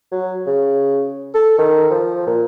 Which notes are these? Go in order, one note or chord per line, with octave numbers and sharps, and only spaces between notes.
F#3
C#3
A4
D#3
F3
A#2